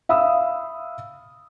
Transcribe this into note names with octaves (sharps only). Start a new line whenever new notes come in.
E5 F5 B5 D#6 E6